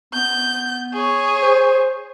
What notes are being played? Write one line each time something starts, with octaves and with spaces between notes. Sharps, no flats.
B3 G6
G#4 C#5
C5